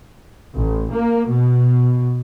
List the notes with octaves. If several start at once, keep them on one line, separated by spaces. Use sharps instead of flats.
A1
A#3
B2